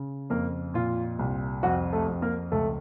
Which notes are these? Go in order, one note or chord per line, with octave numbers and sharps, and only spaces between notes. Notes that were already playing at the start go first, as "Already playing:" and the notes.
Already playing: C#3
F2 A#3 A#4
A#2 F4
C2
F2 F#4
A3 A4
F2
A#3 A#4
C#2 A3 A4